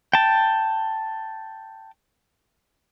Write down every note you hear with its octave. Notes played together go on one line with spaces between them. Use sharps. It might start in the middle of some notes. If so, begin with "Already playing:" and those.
G5 A5